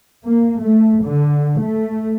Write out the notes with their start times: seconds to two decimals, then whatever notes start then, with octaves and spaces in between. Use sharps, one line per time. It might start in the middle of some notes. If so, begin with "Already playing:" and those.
0.24 A#3
0.61 A3
1.04 D3
1.59 A3